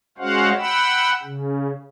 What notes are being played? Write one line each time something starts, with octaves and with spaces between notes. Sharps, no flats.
G#3 C#4 F#4 C5 F5 F#5
F#5 G5 B5 E6
C#3